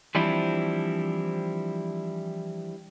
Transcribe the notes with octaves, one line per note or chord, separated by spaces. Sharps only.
E3 F3 G3 C4 D4 E4